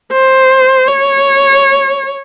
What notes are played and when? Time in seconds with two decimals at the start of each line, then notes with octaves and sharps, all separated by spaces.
0.12 C5
0.88 C#5